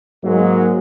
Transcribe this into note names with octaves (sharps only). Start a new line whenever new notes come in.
G#2 F#3 G#3 A#3